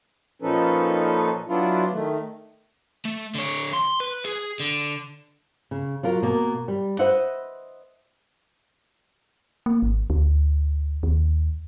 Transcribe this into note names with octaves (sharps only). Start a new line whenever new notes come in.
A#2 F3 C#4 D#4 A4 B4
F#3 B3 D4 E4 F4
D#3 A3
A3
D3 C#5
C6
B4
G#4
D3
C#3
F#3 F4 A#4
B2 A#3
G3
B4 C5 D#5 E5 F#5
A#3
G#1
D2
D#2